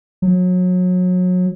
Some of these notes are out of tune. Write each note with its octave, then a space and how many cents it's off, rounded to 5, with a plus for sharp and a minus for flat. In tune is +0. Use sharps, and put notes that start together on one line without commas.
F#3 -30